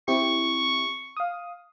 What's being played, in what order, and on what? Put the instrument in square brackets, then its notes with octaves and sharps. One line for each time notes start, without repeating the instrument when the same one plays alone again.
[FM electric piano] C4 E4 G4 [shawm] C#6
[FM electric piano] F5 D#6